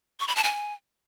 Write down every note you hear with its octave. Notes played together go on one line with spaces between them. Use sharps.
C#6
B5
A5
G#5